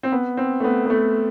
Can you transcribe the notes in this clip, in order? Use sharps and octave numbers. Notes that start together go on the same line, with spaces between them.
C4
B3
C4
A3
B3
B3
A3